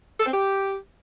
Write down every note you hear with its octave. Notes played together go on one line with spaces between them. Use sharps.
A4
C4
G4